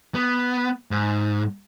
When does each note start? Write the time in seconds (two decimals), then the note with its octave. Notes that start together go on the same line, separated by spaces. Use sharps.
0.15 B3
0.91 G#2